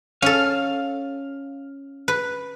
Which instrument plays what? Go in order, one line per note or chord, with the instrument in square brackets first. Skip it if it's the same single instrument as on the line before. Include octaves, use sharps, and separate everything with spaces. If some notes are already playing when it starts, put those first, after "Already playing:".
[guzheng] C#4 A4 [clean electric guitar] F5
[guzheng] B4